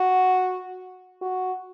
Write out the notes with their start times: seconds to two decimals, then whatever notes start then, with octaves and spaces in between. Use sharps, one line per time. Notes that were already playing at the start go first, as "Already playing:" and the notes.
Already playing: F#4
1.21 F#4